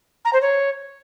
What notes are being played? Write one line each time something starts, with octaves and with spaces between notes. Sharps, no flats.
A#5
C5
C#5